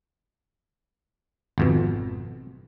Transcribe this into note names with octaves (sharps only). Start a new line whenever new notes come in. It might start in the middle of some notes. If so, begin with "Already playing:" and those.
G#1 F2 B2